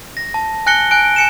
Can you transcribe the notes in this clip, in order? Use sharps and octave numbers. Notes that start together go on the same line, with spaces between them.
A#6
A5
G#5 F#6 A#6 C#7 G7
G#5 F#6 D7
G#5 C#7 E7